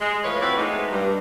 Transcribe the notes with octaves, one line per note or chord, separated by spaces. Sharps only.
G#3
A2 E3 F3 B4 C#5
C4 E4 F#4 B4 D5
G#3 A3 B3 D#4
G2